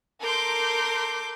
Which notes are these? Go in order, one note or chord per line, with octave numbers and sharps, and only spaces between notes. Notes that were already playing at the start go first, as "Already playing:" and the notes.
A4 A#4 C6 D6 G6